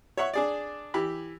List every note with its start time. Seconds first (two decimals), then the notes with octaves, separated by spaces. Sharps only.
0.17 C#5 E5 F#5 C#6
0.34 D4 G#4 D5
0.94 E3 G4 B5